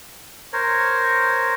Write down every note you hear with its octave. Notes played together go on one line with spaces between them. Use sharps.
A#4 C5 C#5